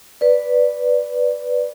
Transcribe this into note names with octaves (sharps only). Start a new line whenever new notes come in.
B4 D5